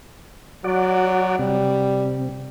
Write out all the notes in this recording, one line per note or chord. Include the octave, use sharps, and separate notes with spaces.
F#3 F#4 D5
C3 G3